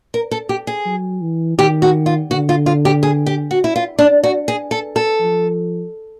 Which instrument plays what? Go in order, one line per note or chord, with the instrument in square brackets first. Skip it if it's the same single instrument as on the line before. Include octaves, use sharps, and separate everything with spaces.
[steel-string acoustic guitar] A#4
A4
G4
G#4
[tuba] F#3
E3
[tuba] D#3 [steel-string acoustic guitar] G4
[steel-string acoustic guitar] F#4
F4
[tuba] D3 [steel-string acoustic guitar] F#4
[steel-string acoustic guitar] F4
F4
G4
G#4
G4
F#4
E4
F4
D4
F#4
G#4
A4
A4
[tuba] F3